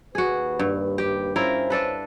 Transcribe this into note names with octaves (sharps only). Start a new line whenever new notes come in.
D#2 F#4 G#4 B4
G2
G4
C#4 E4 F4 A#4 C5
D4 A4 B4